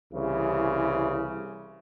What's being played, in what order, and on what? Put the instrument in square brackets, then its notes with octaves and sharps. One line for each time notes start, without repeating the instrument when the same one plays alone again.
[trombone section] C2 C#3 E3